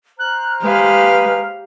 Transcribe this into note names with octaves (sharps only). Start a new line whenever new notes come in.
C5 A#5 F6 F#6
G#3 G4 B4 F5